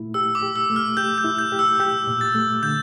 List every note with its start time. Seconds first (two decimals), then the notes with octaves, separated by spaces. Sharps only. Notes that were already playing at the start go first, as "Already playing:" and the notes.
Already playing: A#2 A3 E4
0.14 G4 E6
0.35 D6
0.42 G4
0.56 E6
0.70 A3
0.76 F6
0.97 G4 G6
1.18 G6
1.24 E4
1.38 G6
1.52 G4
1.59 E6
1.80 G4 G6
2.07 A#2
2.21 A6
2.35 A3
2.63 D3 G6